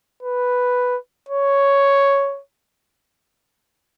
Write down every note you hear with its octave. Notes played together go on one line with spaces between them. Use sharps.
B4
C#5